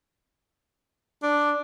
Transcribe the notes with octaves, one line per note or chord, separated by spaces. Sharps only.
D4